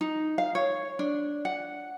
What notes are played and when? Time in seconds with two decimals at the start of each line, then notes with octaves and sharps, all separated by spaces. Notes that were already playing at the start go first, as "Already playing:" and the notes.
0.01 D#4
0.38 F5
0.55 C#5
0.99 D4
1.45 F#5